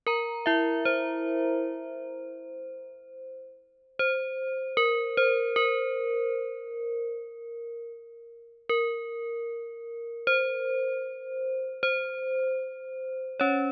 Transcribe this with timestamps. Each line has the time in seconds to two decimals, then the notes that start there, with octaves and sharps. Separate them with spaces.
0.07 A#4 A#5
0.46 E4 E5
0.85 C5
3.99 C5
4.77 A#4
5.17 C5
5.56 A#4
8.69 A#4
10.27 C5
11.83 C5
13.40 C#4 C#5